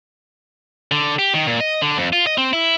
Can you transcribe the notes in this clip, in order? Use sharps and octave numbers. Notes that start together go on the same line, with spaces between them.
D3
G4
D#3
A#2
D#5
D3
F2
F4
D#5
C4
E4